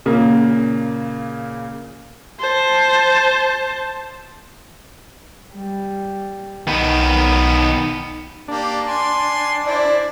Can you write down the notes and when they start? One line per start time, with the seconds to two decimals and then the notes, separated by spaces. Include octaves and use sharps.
0.06 A#2 C#3 A#3
2.40 C5 A5
5.54 G3
6.67 B1 D#3 B3 D#4
8.48 A#3 D4 G4
8.88 G#5 C6
9.67 E4 C5 D5